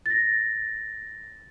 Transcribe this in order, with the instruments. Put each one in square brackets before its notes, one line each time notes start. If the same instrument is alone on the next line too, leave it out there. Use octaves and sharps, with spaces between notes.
[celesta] A6 A#6